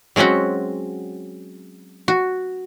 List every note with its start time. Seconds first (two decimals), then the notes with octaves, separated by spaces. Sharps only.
0.16 F#3 G#3 C4 C#4 F#4
2.08 F#4